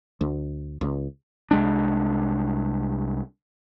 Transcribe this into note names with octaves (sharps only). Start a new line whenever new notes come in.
D2
C#2
C2 G#3 D4